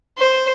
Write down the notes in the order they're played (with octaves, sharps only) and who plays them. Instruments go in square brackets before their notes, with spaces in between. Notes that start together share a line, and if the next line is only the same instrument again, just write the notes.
[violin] C5